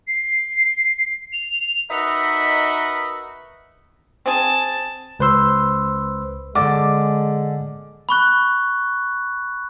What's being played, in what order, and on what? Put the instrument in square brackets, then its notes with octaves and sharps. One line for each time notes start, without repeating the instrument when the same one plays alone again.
[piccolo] C7
F7
[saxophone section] D#4 F#4 A#4 B4 D#5 E5
[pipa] C4 G#4 [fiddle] A5
[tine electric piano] C#2 B4 C5 C6 E6
[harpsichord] D3 A5 [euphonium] G#3 [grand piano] D6
[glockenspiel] B5 C#6 F#6